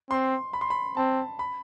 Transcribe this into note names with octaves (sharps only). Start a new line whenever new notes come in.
C4 C6
B5
C6
B5
C4 A5
B5